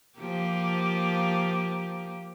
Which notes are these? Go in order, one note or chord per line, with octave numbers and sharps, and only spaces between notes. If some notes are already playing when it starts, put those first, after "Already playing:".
F3 A#3 G4